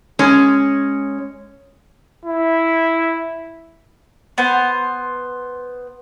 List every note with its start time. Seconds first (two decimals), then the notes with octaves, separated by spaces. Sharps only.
0.19 G#3 C#4
2.25 E4
4.38 B3 C5